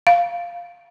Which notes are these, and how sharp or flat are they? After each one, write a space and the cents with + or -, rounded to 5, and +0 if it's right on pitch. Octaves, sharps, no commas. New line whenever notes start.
F5 -5